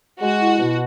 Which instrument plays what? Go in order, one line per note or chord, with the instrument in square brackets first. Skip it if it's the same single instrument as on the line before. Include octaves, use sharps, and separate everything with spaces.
[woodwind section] G#3 [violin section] F#4
[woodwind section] E4
B2